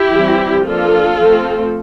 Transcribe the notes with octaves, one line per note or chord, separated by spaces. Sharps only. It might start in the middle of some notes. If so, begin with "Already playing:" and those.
Already playing: E4 G4
E3 G3 C4
F3 A#3 D4 F4 A4
F3 A3 C4